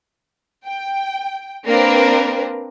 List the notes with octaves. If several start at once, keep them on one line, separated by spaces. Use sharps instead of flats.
G5
A#3 C4 D4 A#4 B4